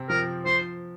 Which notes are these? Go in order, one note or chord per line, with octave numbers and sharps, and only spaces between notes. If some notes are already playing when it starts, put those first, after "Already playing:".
Already playing: C3 C4
F3 A#4
F3 C5